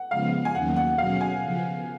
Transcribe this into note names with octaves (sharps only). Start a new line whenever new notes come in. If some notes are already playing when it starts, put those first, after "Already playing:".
Already playing: F#5
C#3 F3 G#3 B3 F5
G#5
D#2 D#3 F#3 A#3 C#4 F#5
F#5
B2 F#3 C#4 G#4 F5
G#5
C#3 F3 B3